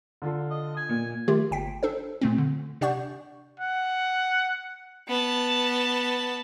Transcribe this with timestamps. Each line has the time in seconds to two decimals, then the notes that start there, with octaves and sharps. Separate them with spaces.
0.22 D3 F4 A4
0.50 D#5
0.77 G#5
0.89 A#2
1.28 D#3 A3 F4 G4
1.51 G1 G5 B6
1.83 D4 A4 C5
2.21 A#2 A3 C4
2.38 D3
2.81 C3 D4 D5 F#5 C#6 G6
3.60 F#5
5.08 B3 A5